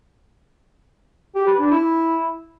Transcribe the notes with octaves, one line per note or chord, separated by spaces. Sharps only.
G4
B4
D4
E4